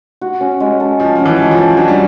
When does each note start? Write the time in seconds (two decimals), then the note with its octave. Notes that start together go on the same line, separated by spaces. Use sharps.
0.21 F#4
0.41 C#4
0.60 G#3
0.80 A4
1.00 F3 F#4
1.15 F3 C#4
1.26 E3
1.38 G#3
1.51 F3
1.58 A4
1.77 F#3 D4
1.88 G3